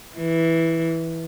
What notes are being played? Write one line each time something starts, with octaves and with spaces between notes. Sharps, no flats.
E3